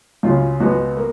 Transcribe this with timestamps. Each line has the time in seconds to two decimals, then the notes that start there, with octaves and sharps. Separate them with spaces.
0.23 C#2 C#3 F#3 F4
0.60 C#2 B2 G#3 B3 F#4
0.97 A#3